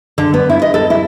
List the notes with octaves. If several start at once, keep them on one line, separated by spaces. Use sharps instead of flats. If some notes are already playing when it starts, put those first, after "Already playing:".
D3
B3
E4
D#5
A4
E4